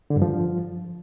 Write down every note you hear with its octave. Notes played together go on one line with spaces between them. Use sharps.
D3
G2
F3